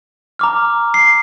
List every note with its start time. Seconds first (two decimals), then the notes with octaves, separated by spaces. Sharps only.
0.39 A#5 D6 F6
0.94 C7